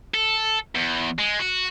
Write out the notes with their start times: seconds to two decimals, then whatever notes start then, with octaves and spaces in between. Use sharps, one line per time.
0.14 A4
0.75 E2
1.19 G#3
1.39 F#4